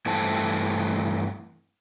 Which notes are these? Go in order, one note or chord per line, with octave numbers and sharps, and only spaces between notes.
G2 E3 A3 C4 A5